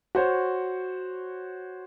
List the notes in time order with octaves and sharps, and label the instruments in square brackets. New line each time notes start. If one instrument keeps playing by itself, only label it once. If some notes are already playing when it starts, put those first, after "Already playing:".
[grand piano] F#4 C5 C#5